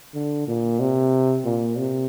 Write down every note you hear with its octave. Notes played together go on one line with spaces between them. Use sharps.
D3
A#2
C3
A#2
C3